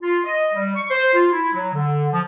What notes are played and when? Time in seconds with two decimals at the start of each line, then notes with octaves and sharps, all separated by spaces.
0.02 F4
0.25 D#5
0.54 G3
0.76 C#6
0.91 C5
1.14 F4
1.31 E4
1.53 F#3
1.74 D3
2.13 F3